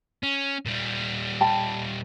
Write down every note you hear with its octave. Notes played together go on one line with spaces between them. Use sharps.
C#4
A#2 G3
G5 A5 B5